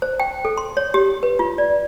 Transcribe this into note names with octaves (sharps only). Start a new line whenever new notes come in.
C5
G5
A4
C6
C#5
G4
B4
F4
D5